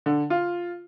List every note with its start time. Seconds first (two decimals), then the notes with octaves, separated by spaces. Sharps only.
0.06 D3
0.30 F4